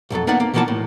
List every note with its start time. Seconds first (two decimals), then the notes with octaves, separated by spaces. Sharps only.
0.10 B1 F2 F#3 A4
0.27 A#3 B3 D#4 D5 F#5
0.40 A#3
0.54 B2 E3 F3 A#3 F#5 A5
0.68 A2